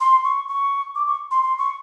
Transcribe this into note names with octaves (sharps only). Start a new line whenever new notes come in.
C6
C#6
C#6
D6
C#6
C6
C6
C#6